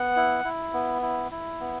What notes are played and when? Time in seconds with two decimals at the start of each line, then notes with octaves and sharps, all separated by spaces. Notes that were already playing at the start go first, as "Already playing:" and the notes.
Already playing: B3 F#5
0.16 E4
0.45 E4
0.74 B3
1.02 E4
1.31 E4
1.60 B3